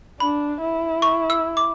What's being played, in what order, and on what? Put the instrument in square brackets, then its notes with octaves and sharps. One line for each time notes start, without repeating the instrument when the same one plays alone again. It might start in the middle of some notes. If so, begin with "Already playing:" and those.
[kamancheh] D4 [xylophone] B5
[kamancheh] E4
[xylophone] C#6
E6
D6